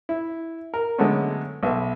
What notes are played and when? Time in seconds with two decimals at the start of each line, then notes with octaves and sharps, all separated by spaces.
0.09 E4
0.74 A#4
0.98 D3 F#3 G#3 A3 B3 C#4
1.63 B1 B4 E5